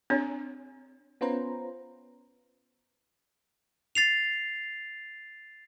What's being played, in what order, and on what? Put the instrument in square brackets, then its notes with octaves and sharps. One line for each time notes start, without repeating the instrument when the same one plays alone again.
[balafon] C4 D4 C#5
[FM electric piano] B3 C#4 F4 B4 C5 A#5
[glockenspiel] A6 C7 F7